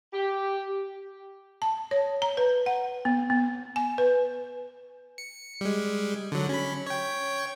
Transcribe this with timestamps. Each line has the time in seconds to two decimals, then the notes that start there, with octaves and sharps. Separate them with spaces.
0.13 G4
1.62 A5
1.91 C#5
2.22 A#5
2.37 B4
2.66 F#5
3.05 B3
3.30 B3
3.76 G#5
3.98 B4
5.18 C#7
5.61 G3 G#3
6.32 D3 F#3
6.49 C#4 B5
6.87 C#5 G5